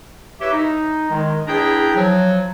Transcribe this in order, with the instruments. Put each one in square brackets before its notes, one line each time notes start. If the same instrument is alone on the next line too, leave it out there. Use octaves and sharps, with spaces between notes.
[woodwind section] E4 G4 B4 C#5 E5
D#4
D#3 G#3
E2 D4 E4 G#4 G5 A#5
F3 F#3